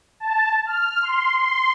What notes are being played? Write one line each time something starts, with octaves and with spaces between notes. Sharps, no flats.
A5
F6
C6
C6